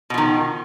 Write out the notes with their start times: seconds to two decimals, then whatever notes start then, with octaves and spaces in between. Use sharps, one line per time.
0.10 B2
0.14 F3
0.18 D#3